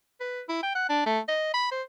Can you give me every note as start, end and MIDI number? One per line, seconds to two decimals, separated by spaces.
0.21 0.42 71
0.49 0.61 64
0.63 0.71 79
0.75 0.84 78
0.89 1.06 62
1.06 1.20 57
1.28 1.52 75
1.54 1.70 83
1.72 1.82 72